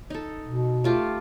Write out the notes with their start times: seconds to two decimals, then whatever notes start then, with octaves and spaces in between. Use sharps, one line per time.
0.10 D#4 A4
0.46 B2
0.84 A3 F4 G4